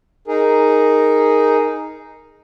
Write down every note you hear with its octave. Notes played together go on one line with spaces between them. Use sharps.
D#4 G#4 A#4